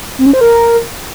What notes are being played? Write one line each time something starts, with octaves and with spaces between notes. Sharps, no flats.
C4
C#4
C5
A#4